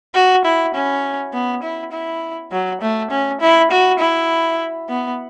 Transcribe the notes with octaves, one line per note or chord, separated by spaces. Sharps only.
F#4
E4
C#4
B3
E4
E4
F#3
A3
C#4
E4
F#4
E4
B3